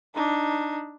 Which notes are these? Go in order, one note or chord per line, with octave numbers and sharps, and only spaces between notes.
D4 D#4